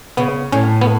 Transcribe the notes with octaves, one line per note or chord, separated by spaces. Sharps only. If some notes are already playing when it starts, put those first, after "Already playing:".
C#3 B3
A2 C#4
B3